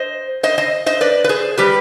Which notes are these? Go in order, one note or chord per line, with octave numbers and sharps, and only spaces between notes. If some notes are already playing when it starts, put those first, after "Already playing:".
Already playing: C5 D#5
C5 D#5
C5 D#5
C5 D#5
B4 D5
B4
G#4 C5
G3 G4 B4